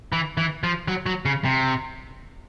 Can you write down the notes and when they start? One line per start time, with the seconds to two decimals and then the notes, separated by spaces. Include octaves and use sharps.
0.12 E3
0.37 E3
0.64 F3
0.88 F#3
1.06 F#3
1.25 C#3
1.45 C3